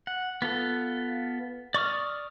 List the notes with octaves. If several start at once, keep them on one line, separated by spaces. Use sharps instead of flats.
F#5
B3 F4 A4
D5 C#6 D#6 F6